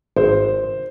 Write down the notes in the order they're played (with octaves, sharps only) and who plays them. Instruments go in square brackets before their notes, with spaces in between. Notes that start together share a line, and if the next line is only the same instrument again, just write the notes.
[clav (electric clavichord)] G#1 [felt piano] C5